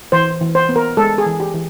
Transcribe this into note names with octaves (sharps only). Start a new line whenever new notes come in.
E3 C5
E3
C5
B3
A#4
G#3 A4
G#4
E3
G4
E3